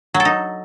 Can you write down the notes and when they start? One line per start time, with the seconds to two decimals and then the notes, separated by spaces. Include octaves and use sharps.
0.14 F#3
0.20 A4
0.25 D#4